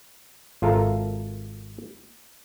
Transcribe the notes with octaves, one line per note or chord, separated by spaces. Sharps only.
G#1 F4 A4 A#4 E5 A#5